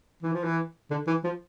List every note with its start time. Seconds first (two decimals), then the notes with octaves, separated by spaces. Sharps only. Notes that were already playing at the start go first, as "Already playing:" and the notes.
0.22 E3
0.33 F3
0.44 E3
0.91 D3
1.07 E3
1.24 F3